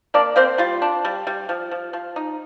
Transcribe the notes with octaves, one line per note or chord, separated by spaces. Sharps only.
A#3 D4 D5
A#3 C4 C5
G3 F4
D4
G3
G3
F3
F3
F3
D#4